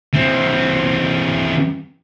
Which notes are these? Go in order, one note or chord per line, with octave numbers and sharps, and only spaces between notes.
E3 C4